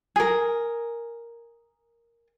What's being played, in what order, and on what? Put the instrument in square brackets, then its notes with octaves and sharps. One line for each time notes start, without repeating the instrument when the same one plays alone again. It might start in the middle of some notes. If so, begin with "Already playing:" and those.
[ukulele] G#4 A#4